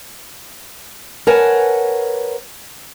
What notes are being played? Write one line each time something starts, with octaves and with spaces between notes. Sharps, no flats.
A#4 B4 C#5 F#5 G#5 A5